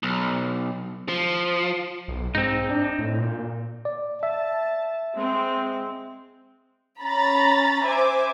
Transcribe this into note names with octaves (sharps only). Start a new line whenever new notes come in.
B1
F3
B1
G#2 C4 D#4
D4
A2
A#2
D5
E5 A5
G#3 C4
C#4 A#5 B5 A6
C5 E5 G#5 D6